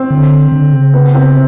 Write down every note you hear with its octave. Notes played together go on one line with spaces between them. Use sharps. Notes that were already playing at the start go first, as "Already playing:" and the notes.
Already playing: C4
D3
D3
C#3
B3
C4